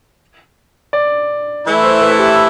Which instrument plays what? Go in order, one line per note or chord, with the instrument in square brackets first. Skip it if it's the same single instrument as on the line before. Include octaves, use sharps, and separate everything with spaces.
[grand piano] D5
[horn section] E3 A3 E4
[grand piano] C5
B4
A4
G4